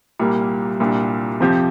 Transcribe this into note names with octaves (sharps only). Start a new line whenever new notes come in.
C2 A#2 G3 A#3
C2 A#2 G3 D4
F2 C3 F3 C4 G4